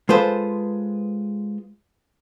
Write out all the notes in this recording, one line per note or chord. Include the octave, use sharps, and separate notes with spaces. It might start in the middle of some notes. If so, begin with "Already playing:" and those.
G#3 F4 A4 B4 C5